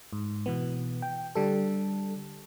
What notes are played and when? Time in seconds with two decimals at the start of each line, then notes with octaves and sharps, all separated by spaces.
0.13 G#2
0.46 B2 E3 B3
1.02 G5
1.35 D3 G3 A4